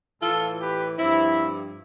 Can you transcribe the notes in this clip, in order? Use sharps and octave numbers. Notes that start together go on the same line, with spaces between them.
A2 E3 F4 A4
G4 B4
G2 F3 C4 E4